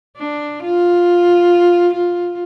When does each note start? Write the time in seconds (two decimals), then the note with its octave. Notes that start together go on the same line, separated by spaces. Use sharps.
0.18 D4
0.63 F4
1.93 F4